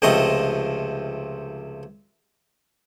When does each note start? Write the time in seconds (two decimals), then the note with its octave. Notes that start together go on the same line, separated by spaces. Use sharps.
0.02 C#2 C3 F3 A3 C4 D#5